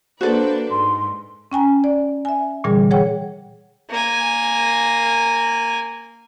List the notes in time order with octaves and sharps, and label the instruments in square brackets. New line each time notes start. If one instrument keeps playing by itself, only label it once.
[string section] A#3 D4 B4 [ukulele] F#4 A4 [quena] C5
[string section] G#2 [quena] C6
[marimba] C#4 G5 G#5 A#5
D5
E5 G#5
A#2 D3 E3 G3 G#4
G#4 C#5 F#5 G5
[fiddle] A#3 G#5